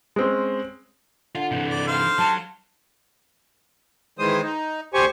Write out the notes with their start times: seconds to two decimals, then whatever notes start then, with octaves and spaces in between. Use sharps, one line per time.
0.16 G#3 C4 C#4
1.35 D3 F4
1.51 C3 E3
1.70 D5
1.88 D#4 G4 C5 F5
2.19 F#3 A5
4.19 D#3 E3 G#3 C5 D#6
4.42 D#4
4.94 D2 G4 C5 G#5 C#6